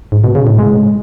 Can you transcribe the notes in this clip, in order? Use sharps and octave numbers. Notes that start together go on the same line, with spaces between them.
G#2
B2
C#3
A2
G#3